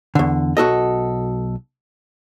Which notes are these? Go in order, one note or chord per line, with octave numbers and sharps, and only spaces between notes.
E2 D3
B1 F#4 A4 D#5